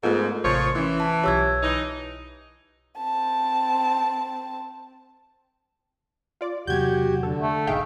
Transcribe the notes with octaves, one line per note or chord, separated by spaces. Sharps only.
G#2 A3 B3 F4 A4 A#4
A1 C3 F3 C#5
E3 C#4 E4
A5
B1 F4 G4 C#5 E6 G#6
E3 D#4
C4 A5
F4 D5
E2 C3 F#3 F#4 G4 G6 G#6
D3 A4
A3
F1 B1 A2 D#4 G#4 E5 F5 G5